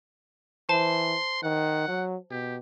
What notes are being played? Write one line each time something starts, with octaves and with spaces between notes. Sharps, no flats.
E3 C5 A5 C6
D#3 F#5
F#3
B2 G4